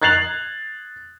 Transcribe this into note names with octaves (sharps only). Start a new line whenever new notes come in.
F#6 G#6 A6 C7 F7 F#7